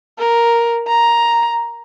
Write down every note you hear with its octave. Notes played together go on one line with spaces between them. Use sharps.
A#4
A#5